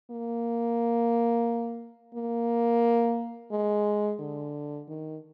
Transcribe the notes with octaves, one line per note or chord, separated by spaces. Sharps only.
A#3
A#3
G#3
D3
D#3